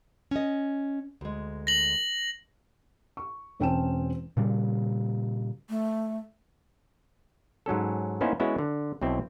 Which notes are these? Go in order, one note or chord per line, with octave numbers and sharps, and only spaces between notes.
C#4 D#5
D2 G#3
A#6 F#7
C#6
E1 C4 C#4 G5 A5 E7
A#2 C#3 G3
A3
G#2 F#3 C#4 A4
A#3 B3 C#4 D#4 E4 C5
G#3 B3 C#4 E4 F#4
D3
B1 B2 C4 E4